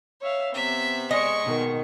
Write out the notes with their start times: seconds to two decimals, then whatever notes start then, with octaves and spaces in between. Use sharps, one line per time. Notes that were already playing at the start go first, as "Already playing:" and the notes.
0.21 C#5 E5 F5
0.54 C3 B3 E5
1.11 G#3 D#5 C#6
1.45 B2 D#3